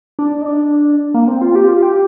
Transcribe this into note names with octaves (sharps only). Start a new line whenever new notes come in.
D4
D#4
D4
A#3
C4
F4
G4
F4
G4